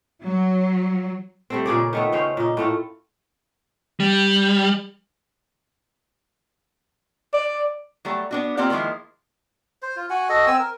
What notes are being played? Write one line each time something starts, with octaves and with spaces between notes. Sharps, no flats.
F#3
G3 A3 C4
A#2 C#3 G#4 D5
D#3 A3 B3
C#3 C#4 C5
A#2 D#4
A2 A3 F4
G3
D5
F#3 G3 A3
B3 D4 F#4
A#3 C4 F4 G4 D5 F#5
D#3 F3 G#3 A#3 E4
C5
F4
F#4 F#5 G#5
F#4 A4 D#5
C4 G#5 E6
A#4